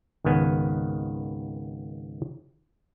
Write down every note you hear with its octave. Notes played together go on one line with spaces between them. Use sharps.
G#1 C#2 D#3 B3 G#5